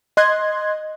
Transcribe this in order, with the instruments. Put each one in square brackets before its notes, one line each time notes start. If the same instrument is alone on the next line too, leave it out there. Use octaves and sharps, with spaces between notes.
[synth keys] D#5 C6 F#6 G#6